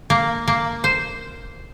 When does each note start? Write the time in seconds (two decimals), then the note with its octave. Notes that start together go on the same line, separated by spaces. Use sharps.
0.10 A#3
0.48 A#3
0.84 C5